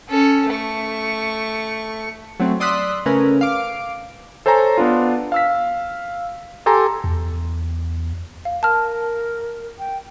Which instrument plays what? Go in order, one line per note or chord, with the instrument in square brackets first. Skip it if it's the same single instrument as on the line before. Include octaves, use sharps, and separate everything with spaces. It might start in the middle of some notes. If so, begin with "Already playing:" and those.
[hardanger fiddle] C#4 A4
A3 C#6
[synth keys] F#3 A3 C4
D5 C6 D#6 E6 F#6 B6
C#3 A3 C#4 A#4 B4
F5 D6 D7
[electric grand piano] A4 C5 C#5 G#5 A#5
B3 D4 F4
F5 E6 B6
G4 A4 G#5 A#5 C6
[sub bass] E2
[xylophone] F5
[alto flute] A#4 [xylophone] A5 F6
[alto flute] G5